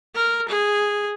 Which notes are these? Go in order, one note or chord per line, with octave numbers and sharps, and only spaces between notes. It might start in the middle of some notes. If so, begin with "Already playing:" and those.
A#4
G#4